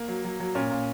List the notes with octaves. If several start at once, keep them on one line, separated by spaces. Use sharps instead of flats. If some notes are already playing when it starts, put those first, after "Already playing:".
Already playing: A#3
F#3
F#3
F#3
A#2 C#4
A#2